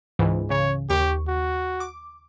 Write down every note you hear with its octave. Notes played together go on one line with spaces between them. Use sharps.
C#2 G#2 E3
C#3 C#5
D#2 G4 C#6
F#4
D6